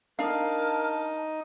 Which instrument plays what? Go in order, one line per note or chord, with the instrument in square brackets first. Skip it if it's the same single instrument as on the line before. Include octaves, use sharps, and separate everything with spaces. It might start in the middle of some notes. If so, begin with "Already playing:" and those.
[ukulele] D4 F5 [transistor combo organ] D#4 [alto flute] A#4 [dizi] A5